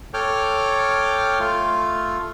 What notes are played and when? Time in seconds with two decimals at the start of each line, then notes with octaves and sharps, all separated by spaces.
0.14 A4 C#5 G5 D6 F6
1.39 A3 F4